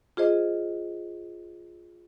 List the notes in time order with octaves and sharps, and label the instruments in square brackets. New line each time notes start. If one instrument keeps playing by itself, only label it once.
[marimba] F4 G#4 C5 D#5